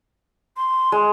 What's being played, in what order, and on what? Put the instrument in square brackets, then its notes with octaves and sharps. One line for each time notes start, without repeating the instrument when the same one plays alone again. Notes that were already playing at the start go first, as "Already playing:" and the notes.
[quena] C6
[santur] G#3